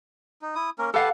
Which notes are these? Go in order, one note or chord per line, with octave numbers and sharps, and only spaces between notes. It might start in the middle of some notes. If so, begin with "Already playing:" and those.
D#4
E4 D#6
A#3 C#4 A#4
G4 A4 B4 F5 F#5 A5